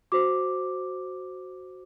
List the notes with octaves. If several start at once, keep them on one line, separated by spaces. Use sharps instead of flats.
F#4 C5 D6